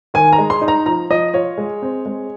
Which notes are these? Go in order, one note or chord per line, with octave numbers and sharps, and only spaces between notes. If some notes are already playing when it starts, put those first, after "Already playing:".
D#3 G#5
A#5
G#3
C6
D#4
A#5
F3 A#5
F3 D#5
F4 C#5
G#3
C4
G#3